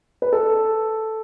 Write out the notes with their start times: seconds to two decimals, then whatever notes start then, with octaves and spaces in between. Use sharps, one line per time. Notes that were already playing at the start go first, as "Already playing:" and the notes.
0.22 B4
0.33 A4